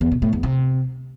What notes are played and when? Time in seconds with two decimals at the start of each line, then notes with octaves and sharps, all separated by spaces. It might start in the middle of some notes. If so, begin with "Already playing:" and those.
0.01 E2
0.12 B2
0.22 A2
0.33 E2
0.43 C3